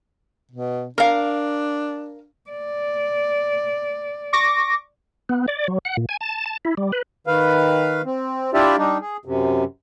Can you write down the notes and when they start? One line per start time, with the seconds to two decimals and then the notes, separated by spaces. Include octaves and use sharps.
0.52 B2
0.98 D4 A#4 F5
2.50 D5
4.33 C#6 D6 A#6
5.29 B3
5.48 D5
5.68 F#3
5.85 F#5
5.97 A#2
6.09 G#5
6.21 A5
6.46 A5
6.65 E4
6.77 G3
6.92 B4
7.27 D#3 B4 F5
8.06 C4
8.54 D4 E4 F4 G4 D5 E5
8.78 G3 D4 D#4
9.01 G#4
9.25 F#2 C3